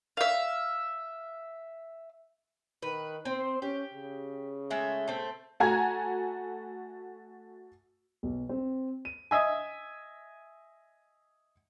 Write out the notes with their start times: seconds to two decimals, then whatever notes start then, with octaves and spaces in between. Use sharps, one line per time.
0.17 E5 F5
2.82 D#3 B4
3.25 C4 C5
3.62 C#4 G4
3.94 C#3
4.70 G#3 A3 E5
5.08 A3 C4
5.60 A3 F#4 G#5 A#5 G#6
8.23 B1
8.49 C4
9.05 D#7
9.31 D#5 E5 G#5